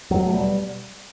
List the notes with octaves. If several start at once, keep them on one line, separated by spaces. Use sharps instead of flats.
E2 F#3
A3
B2 G3